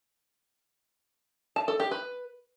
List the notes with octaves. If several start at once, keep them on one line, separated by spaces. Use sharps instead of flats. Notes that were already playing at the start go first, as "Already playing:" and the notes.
A5
A4
G4
B4